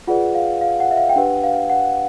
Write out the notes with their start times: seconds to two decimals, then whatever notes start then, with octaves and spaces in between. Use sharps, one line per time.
0.07 F4 G#4 B4 D5 F#5
0.35 F5
0.61 F5
0.80 F#5
0.91 E5
0.97 F5
1.09 G5
1.16 D4 G4 B4 F#5
1.44 F5
1.70 F#5